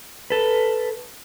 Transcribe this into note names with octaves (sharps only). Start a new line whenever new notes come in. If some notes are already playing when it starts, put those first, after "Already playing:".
A4 B4